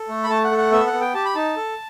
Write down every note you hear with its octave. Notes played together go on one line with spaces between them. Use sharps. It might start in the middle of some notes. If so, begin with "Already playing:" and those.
Already playing: A4
A3
B5
A3 A5
F#5
A4
F#5
B3 E5
F#5
B3
G5
G4 A5
B5
D#4 A5
A4